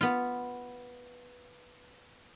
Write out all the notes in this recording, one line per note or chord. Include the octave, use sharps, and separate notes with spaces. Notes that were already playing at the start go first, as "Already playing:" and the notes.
B3 F4